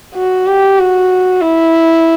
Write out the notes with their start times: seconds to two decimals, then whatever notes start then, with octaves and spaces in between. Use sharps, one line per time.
0.15 F#4
0.47 G4
0.78 F#4
1.41 E4